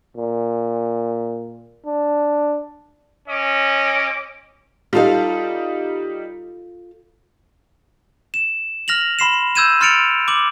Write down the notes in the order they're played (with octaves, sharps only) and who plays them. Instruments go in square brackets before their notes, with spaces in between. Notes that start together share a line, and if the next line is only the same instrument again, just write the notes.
[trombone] A#2
D4
[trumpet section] C#4 D#5 D6
[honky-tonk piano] G3 D#4 [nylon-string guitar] F4 A4 F5
[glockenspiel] E7
F6 A#6 F7 F#7
B5 C6 C7 E7
E6 G6 G#6 D#7 E7
C6 F6 A6 C#7 D7 F7
D6 F#7